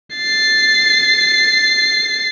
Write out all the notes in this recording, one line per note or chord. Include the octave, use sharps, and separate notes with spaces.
A6 C7